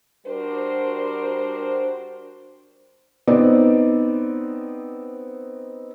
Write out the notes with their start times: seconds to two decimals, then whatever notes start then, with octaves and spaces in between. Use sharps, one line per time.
0.26 G3 D4 F#4 A#4 C5
3.27 B3 C4 D#4 D5